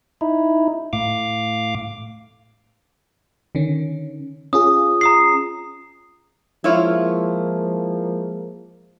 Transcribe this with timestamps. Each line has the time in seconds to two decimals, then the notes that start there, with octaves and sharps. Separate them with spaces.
0.21 D#4 E4
0.93 A2 F5 D6
3.55 D3 D#3 C#4
4.53 C#4 F4 G#4 D#6
5.01 A#5 D#6 C7
6.64 F3 G#3 A#3 E4 F4 C#5